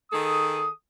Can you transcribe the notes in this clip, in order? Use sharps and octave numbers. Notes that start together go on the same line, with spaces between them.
D#3 G#4 A4 D#6